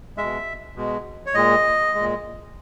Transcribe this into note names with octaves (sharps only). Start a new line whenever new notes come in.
B2 G#3 E5
B2 G#3
C#5
A#2 G#3 D#5
A#2 G#3